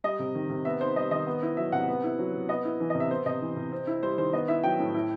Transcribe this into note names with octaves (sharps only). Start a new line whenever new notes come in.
G3 D#5
C3
D#3
C3
B3 E5
D#4 C5
G3 D#5
D#3 D#5
B3
E4
F#3 E5
C3 F#5
B3
E4
F#3
C3
B3 D#5
E4
E3
D#5
C3
E5
B3 C5
C3 D#5
E3
C3
C4
E4
G3 C5
D#3 C5
B3 D#5
E4 E5
F#3 G5
A2
E4